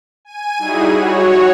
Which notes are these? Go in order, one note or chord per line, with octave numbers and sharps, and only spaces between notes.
G#5 D#7
G3 D#4 E4 F#4 G#4
F#4 C#5